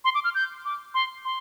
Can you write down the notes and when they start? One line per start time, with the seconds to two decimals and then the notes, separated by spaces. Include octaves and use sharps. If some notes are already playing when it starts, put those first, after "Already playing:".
0.05 C6
0.15 D6
0.24 F6
0.35 G6
0.65 D6
0.94 C6
1.25 C6